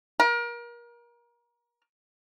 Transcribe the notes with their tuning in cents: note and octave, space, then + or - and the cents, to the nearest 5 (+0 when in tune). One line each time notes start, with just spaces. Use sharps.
A#4 +30